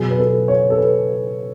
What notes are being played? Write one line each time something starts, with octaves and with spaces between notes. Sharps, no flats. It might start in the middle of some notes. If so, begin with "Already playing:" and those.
Already playing: B2 F#3 G#4
B4
A4
C#5
A4
B4